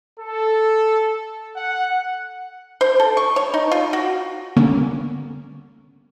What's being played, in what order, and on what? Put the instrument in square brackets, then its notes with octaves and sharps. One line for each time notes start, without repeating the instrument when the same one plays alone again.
[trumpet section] A4
F#5
[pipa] C5
A4
C#6
C#5
D#4
F4
F#4
[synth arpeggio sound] D3 G3 A#3 B3 C#4